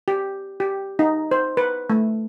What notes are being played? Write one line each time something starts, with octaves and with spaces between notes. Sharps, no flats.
G4
G4
D#4
C5
B4
A3